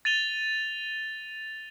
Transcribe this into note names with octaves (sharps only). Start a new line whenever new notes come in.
A6 D#7 F7 G7